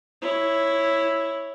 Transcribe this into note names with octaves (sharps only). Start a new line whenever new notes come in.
E4 C#5